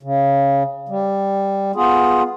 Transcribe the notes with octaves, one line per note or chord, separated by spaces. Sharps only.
C#3
G3
B3 F4 G#4